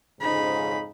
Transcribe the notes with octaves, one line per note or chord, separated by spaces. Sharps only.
F2 G#2 C#3 D#4 B5